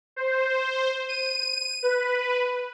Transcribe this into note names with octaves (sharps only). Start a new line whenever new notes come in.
C5
D#7
B4